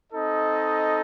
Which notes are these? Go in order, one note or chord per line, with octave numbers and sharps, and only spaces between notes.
C4 D#4 A4 D#5